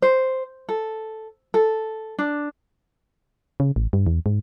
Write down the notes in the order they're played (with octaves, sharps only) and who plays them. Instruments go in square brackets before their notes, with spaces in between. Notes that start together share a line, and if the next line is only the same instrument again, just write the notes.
[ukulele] C5
A4
A4
D4
[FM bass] C#3
A1
G2
E2
G#2